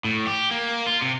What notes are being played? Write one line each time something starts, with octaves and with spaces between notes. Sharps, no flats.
A2
G4
A#3
F4
C3